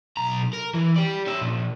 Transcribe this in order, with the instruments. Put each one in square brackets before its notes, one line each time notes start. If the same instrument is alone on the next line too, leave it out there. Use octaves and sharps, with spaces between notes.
[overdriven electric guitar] B1 A#5
A#4
E3
G4 D5
C#4 E5
A#2 F3